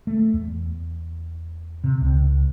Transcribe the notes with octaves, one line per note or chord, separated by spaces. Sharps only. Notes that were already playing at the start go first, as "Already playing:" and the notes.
A3
E2
C3
C#2